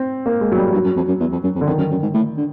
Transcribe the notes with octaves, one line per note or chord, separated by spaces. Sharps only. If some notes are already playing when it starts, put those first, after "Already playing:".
Already playing: C4
A#3
G#3
F#3
G3
G2 F#3
F#2
F2
F#2
E2
F2
F#2
F2
D3
F2 D#3
F#2
F#2
G#2
A2
D3